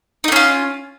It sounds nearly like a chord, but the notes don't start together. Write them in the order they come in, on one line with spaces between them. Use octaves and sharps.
D#4 A3 C#4 F4